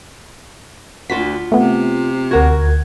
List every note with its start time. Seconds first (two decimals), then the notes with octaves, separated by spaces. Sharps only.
1.10 D2 F4 F#4 F#5 B6
1.52 C3 A3 B3
2.31 D2 F#4 A#4 F#5 G#6